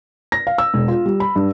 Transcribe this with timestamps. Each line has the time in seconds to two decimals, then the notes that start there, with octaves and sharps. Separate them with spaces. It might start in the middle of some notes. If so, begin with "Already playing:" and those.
0.32 A#6
0.47 F5
0.58 E6
0.74 E1
0.88 F4
1.06 G3
1.20 B5
1.36 G2